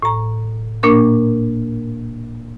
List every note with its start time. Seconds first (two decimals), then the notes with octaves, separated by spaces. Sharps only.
0.02 A2 A#5
0.83 A#2 A#3 D4 A#4 C#6